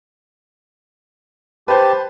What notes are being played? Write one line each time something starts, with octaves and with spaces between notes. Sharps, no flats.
G4 B4 C5 A5